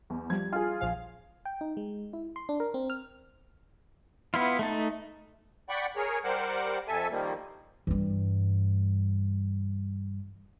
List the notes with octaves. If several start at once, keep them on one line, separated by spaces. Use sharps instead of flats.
E2
F3 G3 G#6
F4 G#4
A#1 F3 F5
G5
D#4
G#3
E4
C6
D4
A#4
C4
F6
B3 E4 F4
A3 D#4 A5
D5 F#5 G5 B5 C#6
G#4 A#4 C#5
G3 A#4 C5 F#5 D6
F2 A4 E5 G#5
D#3 F3 G3 A#3
G2 E3